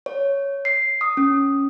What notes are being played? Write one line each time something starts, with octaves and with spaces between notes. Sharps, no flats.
C#5
C7
D#6
C#4